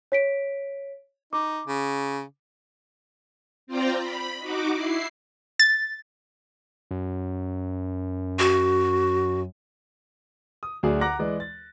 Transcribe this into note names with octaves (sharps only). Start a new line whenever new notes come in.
C#5 B6 D7
D#4 D6
C#3
C4 F4 C5 D5 G5 A#5
B5
D#4 F#4 D6
E4 C7
A6
F#2
F#4
D#6
D2 F#3 G#4 D5 G#5
F#5 A#5 D6 F#6 A#6
E3 G#3 D5
A6